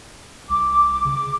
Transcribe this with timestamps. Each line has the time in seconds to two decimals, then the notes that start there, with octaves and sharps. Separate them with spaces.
0.49 C2 D6
1.05 C#3